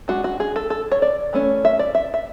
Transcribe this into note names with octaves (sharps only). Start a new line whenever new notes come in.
G#3 D4 F#4
F#4
G#4
A4
A4
C#5
D5
E3 A3 C#4
E5
D5
E5
E5